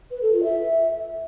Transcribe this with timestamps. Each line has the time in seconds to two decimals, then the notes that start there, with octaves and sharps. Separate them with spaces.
0.11 B4
0.21 A4
0.32 F4
0.43 E5